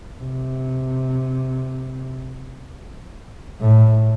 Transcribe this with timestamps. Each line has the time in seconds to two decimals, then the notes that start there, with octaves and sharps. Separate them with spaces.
0.20 C3
3.61 A2